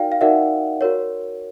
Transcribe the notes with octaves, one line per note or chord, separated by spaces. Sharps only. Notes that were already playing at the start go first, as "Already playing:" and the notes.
Already playing: D#4 F#4 A#4 D5 F5 G5
F5
D#4 F#4 A#4 D5 E5 F#5
F#4 A#4 C#5